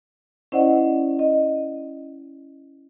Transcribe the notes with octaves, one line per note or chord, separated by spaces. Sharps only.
C#4 E4 C5 D5 D#5 F#5
D#5